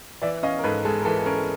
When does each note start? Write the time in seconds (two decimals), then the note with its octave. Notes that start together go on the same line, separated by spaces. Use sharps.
0.22 E3 D5 E5
0.43 C#4 D#5 F5
0.59 A#4
0.64 G#2 A4 B4
0.85 G#3 A4
1.01 A#4
1.05 E3 A4
1.19 A4
1.26 C#4 G#4 A#4